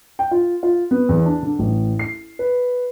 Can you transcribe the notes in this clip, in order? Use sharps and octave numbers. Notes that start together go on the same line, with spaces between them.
G5
F4
F4
B3
E2
D4
D3
A1
C7
B4